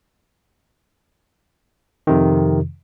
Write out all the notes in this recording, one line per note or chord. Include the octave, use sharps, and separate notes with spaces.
F2 C3 D#3